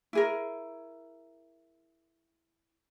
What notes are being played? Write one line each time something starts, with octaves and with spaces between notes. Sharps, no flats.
E4 G#4 A#4